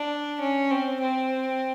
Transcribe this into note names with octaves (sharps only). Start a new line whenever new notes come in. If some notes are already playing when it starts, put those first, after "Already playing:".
Already playing: D4
C#4
C4
C4